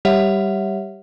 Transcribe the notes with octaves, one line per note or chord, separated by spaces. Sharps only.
G3 G4 C#5 E5 F#5